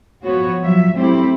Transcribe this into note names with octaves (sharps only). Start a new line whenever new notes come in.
F3 B3 F#4 C#5
F3 F#3 E5
F#3 A3 C4 E4 G4